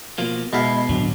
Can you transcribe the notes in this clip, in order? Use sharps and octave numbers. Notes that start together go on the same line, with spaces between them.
B2 F3 A#3
B2 G#3 E4 F5
A2 D3 F#3 D4